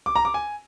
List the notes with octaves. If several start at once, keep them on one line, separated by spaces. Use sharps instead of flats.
D6
A#5
D6
G#5